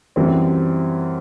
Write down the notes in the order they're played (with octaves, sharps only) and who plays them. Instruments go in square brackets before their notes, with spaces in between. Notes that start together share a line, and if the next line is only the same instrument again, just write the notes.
[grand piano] F#2 E3 G3 C4